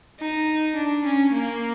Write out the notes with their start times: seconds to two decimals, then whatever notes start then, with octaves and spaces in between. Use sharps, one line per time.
0.20 D#4
0.76 D4
1.05 C#4
1.33 A#3